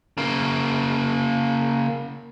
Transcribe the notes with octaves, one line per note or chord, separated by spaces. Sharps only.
C#3 A#3